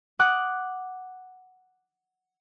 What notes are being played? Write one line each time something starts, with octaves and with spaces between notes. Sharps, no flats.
F#5 D6 D#6 F#6